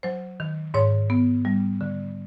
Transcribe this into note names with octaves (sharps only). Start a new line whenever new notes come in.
F#3 C5
D#3
G#2 C#5
B3
G3
D3